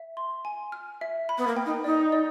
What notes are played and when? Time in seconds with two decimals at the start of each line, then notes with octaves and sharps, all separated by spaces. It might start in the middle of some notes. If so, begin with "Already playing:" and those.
Already playing: E5
0.17 C6
0.45 G#5
0.72 F6
1.01 E5
1.29 B5
1.37 B3
1.47 A#3
1.57 G5
1.65 D#4
1.84 D#4 D5
2.12 D5